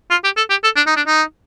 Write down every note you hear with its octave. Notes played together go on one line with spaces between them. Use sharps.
F4
G4
A4
G4
A4
D4
D#4
D4
D#4